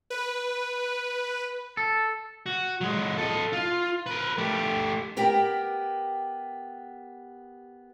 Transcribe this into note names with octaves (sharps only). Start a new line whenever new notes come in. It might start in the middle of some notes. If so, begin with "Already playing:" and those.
B4
A4
F#4
F#3 G#3
A4 D#5
F4
A#4 B4
A3 G4
B3 G4 A#4 G5